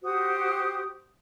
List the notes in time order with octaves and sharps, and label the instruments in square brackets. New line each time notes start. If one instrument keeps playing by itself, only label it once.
[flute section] F#4 G4 C5 D#6